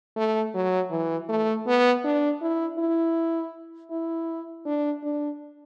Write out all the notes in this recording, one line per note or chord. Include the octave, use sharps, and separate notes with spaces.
A3
F#3
E3
A3
B3
D4
E4
E4
E4
D4
D4